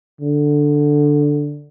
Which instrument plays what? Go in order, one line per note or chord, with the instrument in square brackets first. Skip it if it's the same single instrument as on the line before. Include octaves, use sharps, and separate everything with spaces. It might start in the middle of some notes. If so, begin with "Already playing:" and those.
[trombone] D3